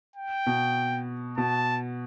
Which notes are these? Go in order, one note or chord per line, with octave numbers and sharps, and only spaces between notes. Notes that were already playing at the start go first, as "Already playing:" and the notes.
G5
B2
B2 A5